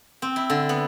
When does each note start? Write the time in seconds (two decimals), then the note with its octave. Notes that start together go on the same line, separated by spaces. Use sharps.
0.22 C4
0.36 E4
0.50 D3
0.69 B3